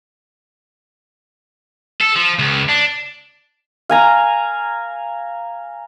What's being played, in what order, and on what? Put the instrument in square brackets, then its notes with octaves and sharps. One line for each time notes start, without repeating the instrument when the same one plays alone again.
[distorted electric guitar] A4
F3
C#2
D4
[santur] F5 G#5 A#5